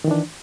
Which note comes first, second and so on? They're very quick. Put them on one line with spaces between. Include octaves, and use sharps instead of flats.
D#3 E3 D4